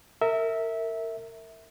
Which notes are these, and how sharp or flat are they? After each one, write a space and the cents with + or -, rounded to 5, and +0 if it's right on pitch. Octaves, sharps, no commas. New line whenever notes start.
A#4 -30 E5 -15